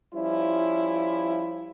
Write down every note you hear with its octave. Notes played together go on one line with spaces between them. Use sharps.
F3 G3 C#4 E4